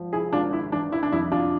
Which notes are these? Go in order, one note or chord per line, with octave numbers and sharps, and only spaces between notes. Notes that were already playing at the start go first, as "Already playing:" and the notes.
Already playing: G#1 F3
E4 G#4
G#1 D4 F4
E4
E3 D4
E4
D4
F2 E4
D4 F4